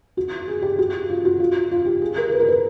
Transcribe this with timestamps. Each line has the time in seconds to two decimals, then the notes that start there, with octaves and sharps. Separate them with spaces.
0.17 F#4
0.48 G#4
0.62 G4
0.79 F#4
1.10 F4
1.25 F#4
1.40 F4
1.71 F4
1.86 G4
2.02 G#4
2.17 A#4
2.32 B4
2.40 A#4
2.48 B4